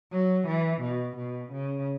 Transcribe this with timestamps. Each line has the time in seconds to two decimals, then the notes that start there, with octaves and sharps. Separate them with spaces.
0.12 F#3
0.47 E3
0.82 B2
1.17 B2
1.52 C#3